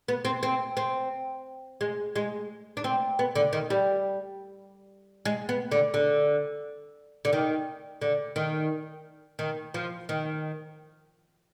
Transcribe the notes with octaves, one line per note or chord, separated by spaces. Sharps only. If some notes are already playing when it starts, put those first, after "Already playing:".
B3
C4
C4
C4
G#3
G#3
D4
C4
B3
D3
D#3
G3
G#3
B3
D3
D3
D3
D#3
D3
D#3
D#3
F3
D#3